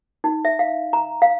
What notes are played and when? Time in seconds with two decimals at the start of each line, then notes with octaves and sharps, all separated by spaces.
0.24 D#4
0.45 E5
0.59 F5
0.93 A#5
1.22 F5